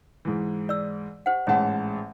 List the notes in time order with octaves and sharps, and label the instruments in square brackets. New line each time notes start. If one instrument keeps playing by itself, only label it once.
[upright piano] G#2 E3
[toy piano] D5 E6
G4 C5 F#5
[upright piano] A1 G#2 A5 [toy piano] C#5 F#5